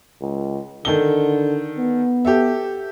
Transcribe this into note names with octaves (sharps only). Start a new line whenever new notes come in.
C#2
D3 D#3 A4 G7
B3
G4 A4 E5